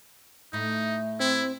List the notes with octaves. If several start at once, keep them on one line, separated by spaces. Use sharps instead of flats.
A2 A3 D#4
C4 E4